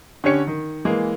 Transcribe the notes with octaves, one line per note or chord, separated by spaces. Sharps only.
D3 C#4 G4 C#5 C#7
D#3
E3 G#3 A#3